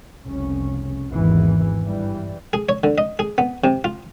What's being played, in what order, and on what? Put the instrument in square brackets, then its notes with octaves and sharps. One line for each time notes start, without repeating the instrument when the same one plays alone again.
[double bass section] F1 C2 C#3 C#4
G#1 E2 E3
G2 E3 G3
[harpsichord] G#4
C#5
D3
D#5
G#4
B3
C3
F4